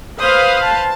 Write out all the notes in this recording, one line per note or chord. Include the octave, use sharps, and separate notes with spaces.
B4 C5 F5 D#6
A5